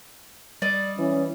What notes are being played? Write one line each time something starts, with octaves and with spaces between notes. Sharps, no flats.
G3 D5 D#5
E3 C#4